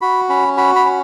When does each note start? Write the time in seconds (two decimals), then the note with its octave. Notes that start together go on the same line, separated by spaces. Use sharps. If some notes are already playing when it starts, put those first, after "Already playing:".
0.01 F#4 B5
0.29 C#4 B5
0.57 F#4 B5
0.76 B5
0.85 C#4